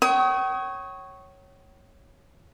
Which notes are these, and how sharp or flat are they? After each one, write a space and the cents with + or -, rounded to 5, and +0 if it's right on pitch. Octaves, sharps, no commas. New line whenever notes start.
C#5 -10 G5 -45 D#6 +30